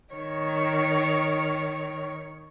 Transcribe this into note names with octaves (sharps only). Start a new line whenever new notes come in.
D#3 C#5